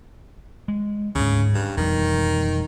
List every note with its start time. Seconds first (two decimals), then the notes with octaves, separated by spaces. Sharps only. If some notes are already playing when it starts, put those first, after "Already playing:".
0.68 G#3
1.15 D2 G#2 C#3
1.54 G2
1.77 E1 F2 D#3 G3